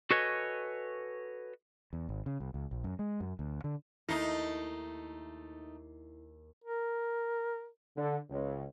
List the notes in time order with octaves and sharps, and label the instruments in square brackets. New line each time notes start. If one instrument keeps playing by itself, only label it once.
[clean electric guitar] F#4 A4 B4 C#5 D#5 G#5
[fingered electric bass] E2
G#1
C#3
C2
C#2
A#1
F#2
G#3
F#2
D2
D3
[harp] D#2 [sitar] A3 D#4 [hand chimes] E4 C7
[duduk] A#4
[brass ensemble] D3
C#2